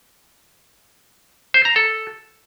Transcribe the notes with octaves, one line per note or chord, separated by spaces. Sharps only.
C5
A#5
A4